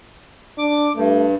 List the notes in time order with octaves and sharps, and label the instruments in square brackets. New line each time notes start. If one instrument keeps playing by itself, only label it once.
[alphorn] D4 [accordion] D6
[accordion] G2 [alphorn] A3